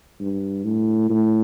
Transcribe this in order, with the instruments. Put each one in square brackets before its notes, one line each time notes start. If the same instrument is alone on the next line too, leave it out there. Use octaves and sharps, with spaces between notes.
[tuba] G2
A2
A2